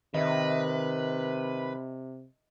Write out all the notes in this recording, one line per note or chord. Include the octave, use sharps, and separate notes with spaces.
C3 D#3 B4 D#5 E5